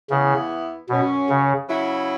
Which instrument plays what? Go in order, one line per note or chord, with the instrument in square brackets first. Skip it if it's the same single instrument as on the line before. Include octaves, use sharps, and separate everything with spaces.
[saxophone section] E2 E3 B3 E4 [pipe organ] C#3
[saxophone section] F#2 F#3 C#4 [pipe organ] B2
[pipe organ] C#3
[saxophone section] C#3 F#3 E4